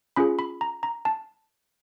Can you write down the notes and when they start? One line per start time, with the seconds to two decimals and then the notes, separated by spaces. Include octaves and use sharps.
0.16 C#4 F4 G#4 B5
0.39 B5
0.61 A#5
0.83 A#5
1.05 A5